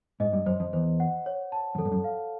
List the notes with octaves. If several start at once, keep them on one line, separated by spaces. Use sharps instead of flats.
G#2 D#5
G2
F#2 C5
F2
E2 C5
F#5
C#5
A5
F#2
F2 A4
G2
F#2
F5